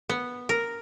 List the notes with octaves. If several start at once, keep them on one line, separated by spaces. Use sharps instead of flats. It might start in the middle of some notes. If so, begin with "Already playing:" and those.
B3
A#4